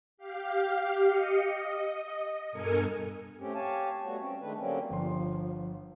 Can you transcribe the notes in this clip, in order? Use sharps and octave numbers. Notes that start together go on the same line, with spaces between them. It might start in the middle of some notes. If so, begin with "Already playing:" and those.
G4 F5
D#5 C#7
D#5
G2 B2 A4 A#4 G#5 C#7
A3 C4 C#4 G4
G4 C#5 F5 G#5 A5
G3 A3 B3 F#4 C#5
C4 C#4
D#3 G#3 A3 D4 B4
D3 F#3 G3 A#3 C4 C#4
G1 F3 C6